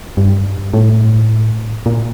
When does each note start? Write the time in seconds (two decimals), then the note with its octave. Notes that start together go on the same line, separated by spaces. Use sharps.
0.17 G2
0.73 A2
1.86 A#2